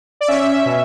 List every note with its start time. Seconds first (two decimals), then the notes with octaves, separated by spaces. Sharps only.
0.21 D5
0.28 C#4 E5
0.66 B2